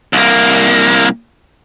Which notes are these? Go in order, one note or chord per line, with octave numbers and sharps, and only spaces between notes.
C2 A#3